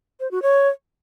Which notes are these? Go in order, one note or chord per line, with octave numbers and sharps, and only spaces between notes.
C5
F#4
C#5